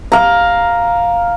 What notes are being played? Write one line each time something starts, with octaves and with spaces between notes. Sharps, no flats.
F5 A#5